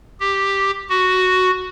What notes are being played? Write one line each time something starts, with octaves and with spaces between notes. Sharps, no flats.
G4
F#4